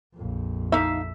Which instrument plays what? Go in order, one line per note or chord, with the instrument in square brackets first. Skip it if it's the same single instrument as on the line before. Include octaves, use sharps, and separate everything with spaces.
[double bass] A#1 F2
[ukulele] D#4 F5 [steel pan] E5